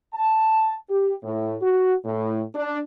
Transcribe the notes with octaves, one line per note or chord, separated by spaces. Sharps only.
A5
G4
A2
F#4
A2
D4